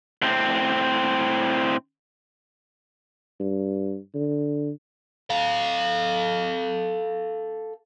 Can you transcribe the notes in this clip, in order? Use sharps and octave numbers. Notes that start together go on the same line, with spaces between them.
A2 C4
G2
D3
A4 F5